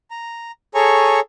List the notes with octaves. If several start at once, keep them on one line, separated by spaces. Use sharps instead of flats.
A#5
G#4 A4 C#5 G#5 A#5 C#6